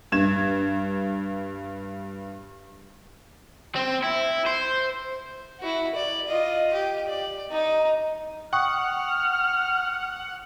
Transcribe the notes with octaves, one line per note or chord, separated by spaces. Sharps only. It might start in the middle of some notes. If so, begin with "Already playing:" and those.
G2 G#6 E7
C4
E4
C5
E4 F#4
D5
F4 D#5
G4
D5
D#4
F#5 G5 C#6 D#6 F6